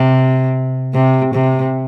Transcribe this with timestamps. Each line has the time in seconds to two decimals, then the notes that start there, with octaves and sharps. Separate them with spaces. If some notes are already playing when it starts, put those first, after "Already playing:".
Already playing: C3
0.94 C3
1.34 C3